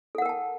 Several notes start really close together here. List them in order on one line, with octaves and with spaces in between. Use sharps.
A4 F#5 A#4 G5 A5